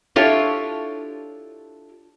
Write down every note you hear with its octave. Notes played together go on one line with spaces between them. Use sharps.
D4 E4 F4 G4 A4 C#5